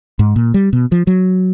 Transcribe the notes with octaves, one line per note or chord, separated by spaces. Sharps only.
G#2
A#2
G3
B2
F3
F#3